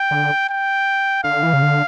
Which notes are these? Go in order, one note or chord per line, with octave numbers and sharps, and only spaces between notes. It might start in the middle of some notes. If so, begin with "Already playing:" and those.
Already playing: G5
D3
G5
D3 F5
E3
C#3
D3